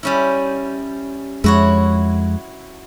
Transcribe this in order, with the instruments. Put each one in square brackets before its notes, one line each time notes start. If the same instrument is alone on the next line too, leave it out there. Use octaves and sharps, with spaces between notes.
[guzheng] G3 C#4 E4
[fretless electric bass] F2 G#3 [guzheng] E4 F#4 C#5